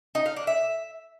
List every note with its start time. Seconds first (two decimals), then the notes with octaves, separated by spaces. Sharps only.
0.15 D#4
0.26 F5
0.36 D4
0.47 E5